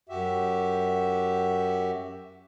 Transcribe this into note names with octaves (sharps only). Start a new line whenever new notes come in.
F#2 F#4 G4 E5